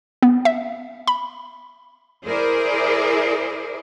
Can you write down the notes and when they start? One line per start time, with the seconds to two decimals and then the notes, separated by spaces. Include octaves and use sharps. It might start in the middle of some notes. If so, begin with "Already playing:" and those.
0.23 B3
0.45 E5
1.07 B5
2.26 E4 G#4 A#4 C5 D5